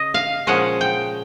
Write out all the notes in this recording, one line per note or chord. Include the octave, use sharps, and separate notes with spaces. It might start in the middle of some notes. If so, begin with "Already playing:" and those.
Already playing: C#3 D#5
F5
A#2 F3 G#3 C#4 F#5
G5